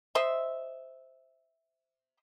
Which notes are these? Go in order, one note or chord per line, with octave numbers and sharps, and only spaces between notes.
C5 D#5 E5